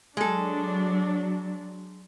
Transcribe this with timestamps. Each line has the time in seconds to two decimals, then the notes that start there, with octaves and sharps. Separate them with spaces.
0.17 F#3 G#3 D4 A4